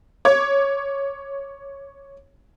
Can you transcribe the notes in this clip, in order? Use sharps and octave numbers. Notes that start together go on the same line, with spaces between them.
C#5 D6 G#6